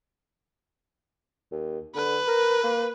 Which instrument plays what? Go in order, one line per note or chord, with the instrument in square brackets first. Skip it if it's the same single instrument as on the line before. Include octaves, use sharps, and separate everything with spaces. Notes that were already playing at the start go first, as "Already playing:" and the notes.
[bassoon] D#2
[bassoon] D3 [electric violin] B4
[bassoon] A#4
A#3